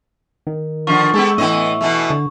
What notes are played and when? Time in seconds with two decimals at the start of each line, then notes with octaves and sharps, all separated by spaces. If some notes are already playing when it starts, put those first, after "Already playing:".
0.47 D#3
0.87 D3 F3 C#6
1.14 G#3 B3 G4 A4
1.38 A2 E3 B3 D#5
1.81 B2 E3 A3
2.10 D3